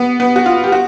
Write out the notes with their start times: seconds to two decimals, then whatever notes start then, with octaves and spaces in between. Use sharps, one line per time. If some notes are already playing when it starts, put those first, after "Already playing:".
Already playing: B3
0.20 B3
0.36 F#4
0.46 F4
0.64 G4
0.72 F#4